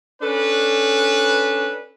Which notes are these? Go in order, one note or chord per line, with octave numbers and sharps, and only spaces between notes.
C#4 D4 A4 B4